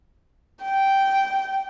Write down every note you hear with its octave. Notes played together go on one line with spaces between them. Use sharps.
G5